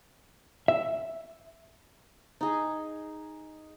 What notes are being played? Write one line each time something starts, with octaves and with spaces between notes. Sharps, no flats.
E5
D#4 G#4